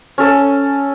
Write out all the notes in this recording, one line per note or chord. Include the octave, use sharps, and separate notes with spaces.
C#4 A4